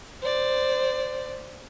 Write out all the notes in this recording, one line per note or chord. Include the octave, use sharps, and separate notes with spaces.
C5 D5